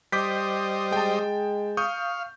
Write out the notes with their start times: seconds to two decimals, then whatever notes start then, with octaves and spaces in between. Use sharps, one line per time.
0.12 G3 C5 D#5 D6 G6 B6
0.92 G#3 G5 A5
1.77 F5 C#6 D#6 G6